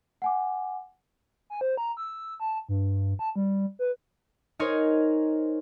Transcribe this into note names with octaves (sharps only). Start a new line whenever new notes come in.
F#5 G#5 D6
G#5
C5
A#5
E6
A5
G2
A5
G3
B4
D#4 G#4 A#4 C5 C#5 D#5